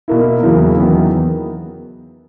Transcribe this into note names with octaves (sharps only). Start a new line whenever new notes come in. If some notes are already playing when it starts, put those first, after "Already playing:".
B2 A#3 E4
E2 C#3 F#3 A#3 E4
E2 D#3 F#3 B3 D#4